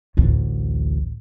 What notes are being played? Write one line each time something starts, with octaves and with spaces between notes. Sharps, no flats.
A1 D2